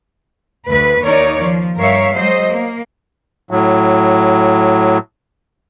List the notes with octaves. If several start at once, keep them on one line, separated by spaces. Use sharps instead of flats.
D2 B4
D#2 D#4 A#4 C#5 D5
F3
G2 A#4 C#5 E5 F5
F#3 G#3 C5 D#5
A#3
A2 F#3